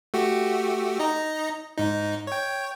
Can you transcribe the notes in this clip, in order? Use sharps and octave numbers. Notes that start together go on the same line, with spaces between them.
A3 F#4 G4
D#4 D#5 A#5
G#2 D#4
C#5 G5